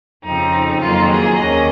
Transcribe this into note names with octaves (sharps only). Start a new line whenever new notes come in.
F2 C#3 F3 C4 D#4
F2 D#3 F#3 A#3 F4
G#4
D#2 D#3 A#3 C#4 D#5